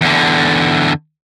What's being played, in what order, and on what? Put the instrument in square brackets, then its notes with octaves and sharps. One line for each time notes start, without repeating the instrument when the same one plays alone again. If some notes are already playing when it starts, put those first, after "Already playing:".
[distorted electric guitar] E2 D3